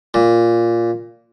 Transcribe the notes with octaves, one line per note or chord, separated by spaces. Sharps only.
A#2